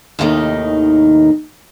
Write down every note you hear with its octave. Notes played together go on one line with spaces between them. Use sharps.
D#2 A2 C3 D#3 D#4 D#5